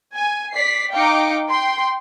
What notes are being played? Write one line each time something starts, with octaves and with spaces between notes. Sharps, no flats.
G#5
D5 B6 C7
D#4 F5 G5 A#5 D6 C#7
G5 C6